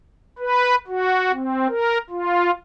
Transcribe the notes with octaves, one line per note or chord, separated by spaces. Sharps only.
B4
F#4
C4
A#4
F4